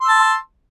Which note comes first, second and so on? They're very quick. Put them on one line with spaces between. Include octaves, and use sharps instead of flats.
C6 E6 A5